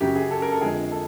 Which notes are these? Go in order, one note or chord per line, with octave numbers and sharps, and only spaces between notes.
F#2 C#3 F#3 G4
G#4
A4
A#4
A4
F2 D3 F3 G#3 G#4
A4